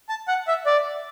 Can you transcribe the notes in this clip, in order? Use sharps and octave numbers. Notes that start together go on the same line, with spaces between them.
A5
F#5
E5
D5